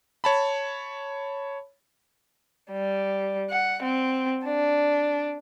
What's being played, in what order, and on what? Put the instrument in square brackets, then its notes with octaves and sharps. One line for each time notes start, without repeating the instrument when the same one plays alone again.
[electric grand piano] C#5 A5 B5
[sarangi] G3
F#5
C4
D4